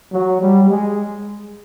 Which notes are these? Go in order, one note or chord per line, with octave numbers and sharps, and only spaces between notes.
F#3
G3
G#3